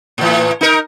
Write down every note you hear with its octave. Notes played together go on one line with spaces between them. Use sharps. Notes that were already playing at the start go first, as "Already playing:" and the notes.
A2 E3
D#4 A#4